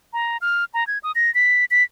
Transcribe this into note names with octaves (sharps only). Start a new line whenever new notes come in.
A#5
F6
A#5
G#6
D#6
A#6
B6
B6